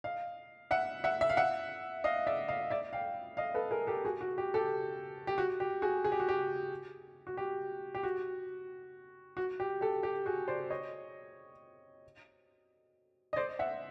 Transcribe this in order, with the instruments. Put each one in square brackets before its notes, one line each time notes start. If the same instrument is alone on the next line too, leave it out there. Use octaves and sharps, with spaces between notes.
[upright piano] D#5 F5
E5 F#5
E5 F#5
E5
F5
E5 F#5
D#5 F5
D5 E5
D#5 F5
D5 E5
F5 G5
D#5 F5
A4 B4
G#4 A#4
G4 A4
F#4 G#4
F#4
G4
G4 A4
G4
F#4
G4
F#4 G#4
G#4
G4
F#4
G4
F#4
G4
G4
F#4
F#4
G4
G4 A4
G4
F#4 G#4
C5 D5
C#5 D#5
D#5
C5 D5
E5 F#5